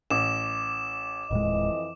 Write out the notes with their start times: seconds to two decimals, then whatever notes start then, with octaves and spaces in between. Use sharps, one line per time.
0.10 A1 D6 E7
1.31 D#1 F2 A2 E3 G#3 D#5